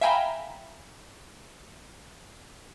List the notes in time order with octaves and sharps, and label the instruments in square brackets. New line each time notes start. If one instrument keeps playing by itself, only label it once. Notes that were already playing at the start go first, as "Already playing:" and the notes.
[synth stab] E5 F5 G5 G#5 A#5 B5